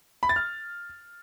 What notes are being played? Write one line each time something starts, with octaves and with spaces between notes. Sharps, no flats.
B5
A6
F6